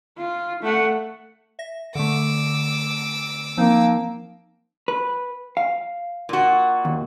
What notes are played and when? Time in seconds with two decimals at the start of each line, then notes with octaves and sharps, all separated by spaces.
0.18 F4
0.62 A3 F#5
1.59 E5 A#6
1.95 D3 A3 D6 E6
3.57 F3 A#3 C4 D#4
4.88 B4
5.57 F5
6.29 A#2 F#4
6.85 D#2